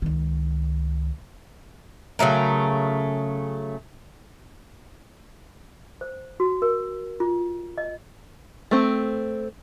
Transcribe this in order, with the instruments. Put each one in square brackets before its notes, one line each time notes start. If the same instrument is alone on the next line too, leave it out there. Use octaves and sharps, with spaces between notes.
[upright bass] C#2 D#3
[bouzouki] C#3 F#3 A3 A#4
[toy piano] C5
F#4
A#4
F4
D#5
[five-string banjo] A3 C4